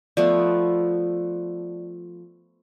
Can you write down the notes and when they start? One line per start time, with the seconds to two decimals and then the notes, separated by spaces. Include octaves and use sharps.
0.17 F3 A3 B3 D5